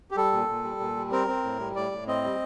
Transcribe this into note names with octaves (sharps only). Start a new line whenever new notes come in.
G4
G3 A4
A#2
A#2
G3
A#2
G3
C4 A#4
C4
A2
G3
A2 D5
A2
C4 D#5
G3